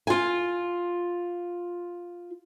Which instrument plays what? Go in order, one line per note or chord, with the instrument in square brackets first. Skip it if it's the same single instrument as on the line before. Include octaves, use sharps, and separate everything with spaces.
[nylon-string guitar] F4 G#5